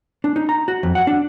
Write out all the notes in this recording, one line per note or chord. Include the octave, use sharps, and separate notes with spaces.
D4
D#4
A#5
F#4
F2
F#5
D4